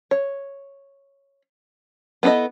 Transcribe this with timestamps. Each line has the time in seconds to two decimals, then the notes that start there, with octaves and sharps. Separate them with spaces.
0.11 C#5
2.23 B3 E4 F4 A4 D#5